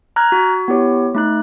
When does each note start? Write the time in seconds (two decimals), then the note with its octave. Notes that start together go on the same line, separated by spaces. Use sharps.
0.16 A#5 F6 F#6 G#6
0.32 F#4
0.68 B3 E4 G4 C#5
1.14 A3 D#4 F#6